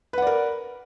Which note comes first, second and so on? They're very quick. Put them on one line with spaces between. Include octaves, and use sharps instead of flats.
B4 F#5 D5 A#4